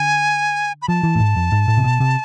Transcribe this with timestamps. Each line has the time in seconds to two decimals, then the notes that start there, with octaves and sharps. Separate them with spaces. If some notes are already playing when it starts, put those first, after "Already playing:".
Already playing: D3 G#5
0.82 B5
0.88 F3 A5
1.03 E3
1.15 A2
1.20 G#2
1.36 F2
1.52 G#2
1.68 A2
1.77 C3
1.84 B2
2.00 C3